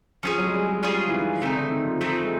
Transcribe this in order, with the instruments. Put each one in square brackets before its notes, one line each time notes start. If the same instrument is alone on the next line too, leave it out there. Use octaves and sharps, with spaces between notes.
[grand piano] F3 [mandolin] C#4 F4 G#4
[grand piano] F#3
G#3
G3
G#3
[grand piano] G3 [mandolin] C#4 F4 G#4
[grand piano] E3
D#3
[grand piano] C#3 [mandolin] A3 C4 D#4
[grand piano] D3
D#3
F3
[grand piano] F3 [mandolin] A3 C4 D#4
[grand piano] G#3